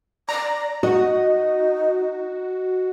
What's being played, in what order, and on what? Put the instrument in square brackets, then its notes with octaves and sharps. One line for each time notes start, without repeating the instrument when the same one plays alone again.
[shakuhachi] D5 [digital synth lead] A#5
[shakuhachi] D#4 [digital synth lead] F#4 [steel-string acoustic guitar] D#5